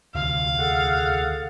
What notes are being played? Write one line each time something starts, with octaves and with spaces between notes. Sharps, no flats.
D2 C3 D#3 F5
G#4 A4 F#5